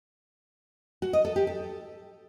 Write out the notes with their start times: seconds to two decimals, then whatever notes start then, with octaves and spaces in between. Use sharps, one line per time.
1.02 F#4
1.13 D#5
1.25 A4
1.36 G4
1.47 A4